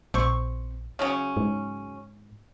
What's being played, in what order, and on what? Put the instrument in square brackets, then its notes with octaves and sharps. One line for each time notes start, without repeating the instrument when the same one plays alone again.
[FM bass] A#1 [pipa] C4 C#6
[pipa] C#3 F#3 C#4
[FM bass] G#2